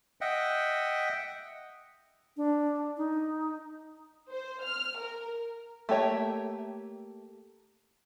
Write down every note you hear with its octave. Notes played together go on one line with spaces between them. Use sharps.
D#5 E5 F#5 G5
D4
D#4
C5
F6
A#4
A3 A#3 G4 C#5 E5